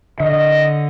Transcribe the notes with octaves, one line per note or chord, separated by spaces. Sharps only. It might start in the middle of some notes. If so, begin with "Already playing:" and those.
D3 D#5